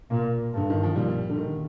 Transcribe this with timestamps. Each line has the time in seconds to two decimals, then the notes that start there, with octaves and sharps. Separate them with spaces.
0.10 A#2 A#3
0.53 G2 D3
0.70 D#3
0.83 F3
0.96 A#2 G3
1.30 D3
1.38 D#3